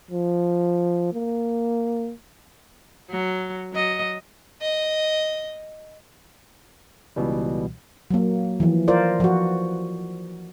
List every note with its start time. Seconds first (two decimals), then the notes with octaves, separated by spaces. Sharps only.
0.11 F3
1.13 A#3
3.11 F#3
3.73 F#3 D#5
4.61 D#5
7.16 C#2 B2 E3 G3
8.11 F#3 A#3
8.60 E3 F3
8.88 F4 A#4 C5 D5
9.20 F3 F#4